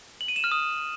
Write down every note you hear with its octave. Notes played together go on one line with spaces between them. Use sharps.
F#7
D#7
E7
F6
D#6